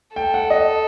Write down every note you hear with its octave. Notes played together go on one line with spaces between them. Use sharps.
A4 G5
F#5
D#5